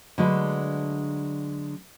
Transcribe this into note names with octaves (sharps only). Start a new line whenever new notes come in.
D3 F#3 G#3 A3 D4 B4